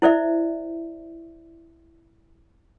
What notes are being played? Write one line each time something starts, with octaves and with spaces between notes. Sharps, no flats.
E4 C5 D5 E5